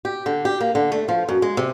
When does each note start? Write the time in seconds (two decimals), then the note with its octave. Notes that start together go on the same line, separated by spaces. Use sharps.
0.05 G4
0.26 D3
0.45 G4
0.60 A#3
0.75 D3
0.92 A3
1.08 F3
1.29 F#2
1.42 G#3
1.57 C3